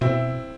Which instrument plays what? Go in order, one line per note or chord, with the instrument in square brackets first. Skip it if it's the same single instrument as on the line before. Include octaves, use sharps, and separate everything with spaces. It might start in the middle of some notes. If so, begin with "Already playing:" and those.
[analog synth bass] B2 [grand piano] C4 E4